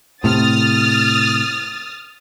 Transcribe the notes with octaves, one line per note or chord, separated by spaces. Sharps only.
A2 C3 D#6 F6 A6